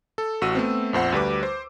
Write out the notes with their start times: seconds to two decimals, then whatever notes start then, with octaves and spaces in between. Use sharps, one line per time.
0.18 A4
0.41 A1 F#4 E6 D#7
0.55 A3 B3 C4
0.93 A#1 F2 C5 F#5
1.12 D2 G3 B4 D6
1.43 C5